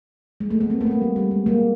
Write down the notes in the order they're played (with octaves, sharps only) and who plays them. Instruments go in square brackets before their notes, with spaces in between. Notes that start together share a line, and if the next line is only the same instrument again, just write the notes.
[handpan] G#3
A3
A3 B3
A#3 C4
A3 B3
A#3
A3
G3
G3
G#3
G#3 A#3